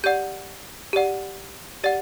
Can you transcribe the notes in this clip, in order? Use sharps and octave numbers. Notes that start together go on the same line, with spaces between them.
G4 D5 F#5 G6
G4 D5 F#5
G4 D5 F#5 A6